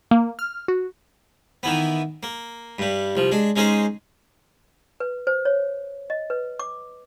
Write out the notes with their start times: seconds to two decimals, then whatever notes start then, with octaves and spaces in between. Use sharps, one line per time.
0.11 A#3
0.39 F6
0.68 F#4
1.63 D#3 E3 B3
2.23 A#3
2.78 G2 G3
3.15 C2 F3
3.31 G#3 D4
3.56 G#3 C#4 D#4 G#4 C5
5.00 B4
5.27 C5
5.45 C#5
6.10 D#5
6.30 B4
6.60 D6